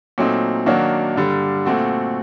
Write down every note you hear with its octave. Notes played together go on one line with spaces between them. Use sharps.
A#2 F#3 A3 C4 D#4
D#3 F#3 A#3 D4 F#4
G2 D3 G3
A#2 A3 C4 F#4